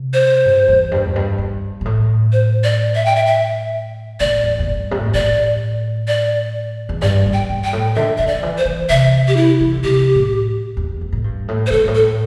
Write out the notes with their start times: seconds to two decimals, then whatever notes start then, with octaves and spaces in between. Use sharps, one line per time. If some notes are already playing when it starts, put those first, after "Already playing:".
Already playing: C3
0.13 C5
0.45 G2
0.68 E2
0.91 G2
1.05 E2
1.16 G2
1.38 G2
1.81 G2
1.85 A2
2.32 C5
2.64 D5
2.95 E5
3.06 G5
3.16 E5
3.26 E5
4.20 A2 D5
4.43 E2
4.59 E2
4.67 G2
4.91 C3
4.99 A2
5.07 G2
5.14 A2 D5
6.08 D5
6.89 E2
7.01 G2 D5
7.26 G2
7.33 G5
7.49 G2
7.64 G5
7.73 A2
7.96 D3 E5
8.18 D3 E5
8.27 E3 D5
8.34 D3
8.43 E3
8.58 C5
8.66 E3
8.89 C3 E5
9.28 G4
9.37 E4
9.60 E3
9.72 D3
9.84 C3 G4
10.15 A2
10.77 E2
11.01 E2
11.13 A2
11.24 G2
11.48 A2
11.67 C5
11.71 A2 A4
11.80 G2
11.88 A2
11.95 A4